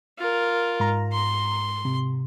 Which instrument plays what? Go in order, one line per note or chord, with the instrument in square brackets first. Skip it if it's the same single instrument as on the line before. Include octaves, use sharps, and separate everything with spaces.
[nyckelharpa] F4 A#4
[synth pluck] G#2 A#5
[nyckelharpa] C6
[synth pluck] C3